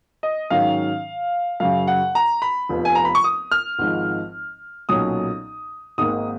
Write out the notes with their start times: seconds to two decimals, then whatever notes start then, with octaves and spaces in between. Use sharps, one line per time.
0.23 D#5
0.50 G#2 D#3 F#3 C#4 F5
1.60 F#2 C#3 F#3 F5
1.87 F#5
2.15 A#5
2.42 B5
2.69 F1 F2 F3 B3
2.85 G#5
2.95 A#5
3.05 B5
3.15 C#6
3.24 D#6
3.52 F6
3.79 G#1 G#2 F3
4.89 B1 A#2 F#3 C#4 D#6
5.98 G#1 G#2 D#3 A#3 D#6